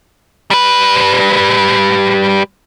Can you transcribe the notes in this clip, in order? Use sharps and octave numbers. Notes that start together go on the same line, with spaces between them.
G3 B4